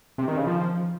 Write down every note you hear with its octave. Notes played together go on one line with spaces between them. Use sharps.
C3
D#3
C#3
F3